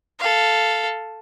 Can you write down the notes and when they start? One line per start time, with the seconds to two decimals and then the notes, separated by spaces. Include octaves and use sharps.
0.19 A4 F5